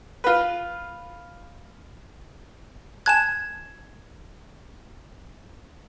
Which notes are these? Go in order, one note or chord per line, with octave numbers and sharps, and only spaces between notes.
F4 B4
G#5 A5 F#6 G#6 E7